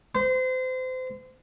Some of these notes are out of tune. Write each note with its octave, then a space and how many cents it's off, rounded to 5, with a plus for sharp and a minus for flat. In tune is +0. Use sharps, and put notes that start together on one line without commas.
C5 -30